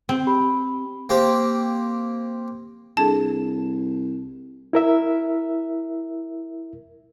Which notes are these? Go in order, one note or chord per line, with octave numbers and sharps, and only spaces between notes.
C4
G4 B5
A#3 C4 G4
C2 D4 G#4 A4 A5
E4 A#4 E5